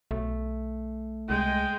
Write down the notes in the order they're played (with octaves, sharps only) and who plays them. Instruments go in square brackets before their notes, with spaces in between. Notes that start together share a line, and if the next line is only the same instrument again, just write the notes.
[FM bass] B1 [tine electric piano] A3
[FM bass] C2 [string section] G#3 [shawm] G5